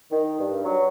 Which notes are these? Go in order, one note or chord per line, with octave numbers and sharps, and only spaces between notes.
D#3
G2
F#3